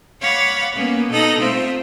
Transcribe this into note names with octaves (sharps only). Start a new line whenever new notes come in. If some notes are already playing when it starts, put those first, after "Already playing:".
C#5 F5 F#5 B5 D6 A6
A#3 B3 C#4
B2 D#4 A4 F#6 A#6
A3 C4 F4 C5 E5